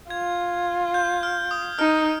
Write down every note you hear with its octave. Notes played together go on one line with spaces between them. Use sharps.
F4 G#6
G6
F6
D#6
D#4 F6